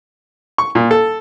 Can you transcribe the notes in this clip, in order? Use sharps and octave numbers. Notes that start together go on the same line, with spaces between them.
C#6
A#2
A4